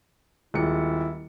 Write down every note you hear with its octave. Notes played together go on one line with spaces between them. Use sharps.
D#1 G#3 E4 C#7